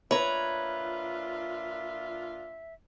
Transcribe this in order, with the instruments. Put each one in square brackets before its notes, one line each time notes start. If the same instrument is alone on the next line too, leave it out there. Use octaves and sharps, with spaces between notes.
[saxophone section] A#2 D4 F4 [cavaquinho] B4 [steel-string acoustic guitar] C#5 A#5 [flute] E5